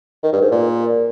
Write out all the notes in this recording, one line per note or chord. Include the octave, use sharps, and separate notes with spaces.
D#3
G2
G#2
A#2